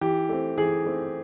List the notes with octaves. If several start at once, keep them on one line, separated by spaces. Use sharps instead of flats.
E3 G4
A3 C4
E3 G#4
A3 C4